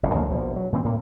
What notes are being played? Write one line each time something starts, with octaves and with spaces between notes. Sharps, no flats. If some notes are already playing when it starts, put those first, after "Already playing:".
F#1 F2 A2
D2 F3 F#3 A#3
A#1 B2 F3
F#3
A#2 E3 A3 C4
A2 A#3